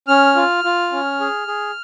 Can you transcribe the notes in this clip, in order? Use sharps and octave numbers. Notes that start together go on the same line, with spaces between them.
C#4 F6
F4
F4
C#4
G#4
G#4